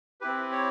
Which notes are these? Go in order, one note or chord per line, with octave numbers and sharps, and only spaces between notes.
C4 E4 G4 B4
C#5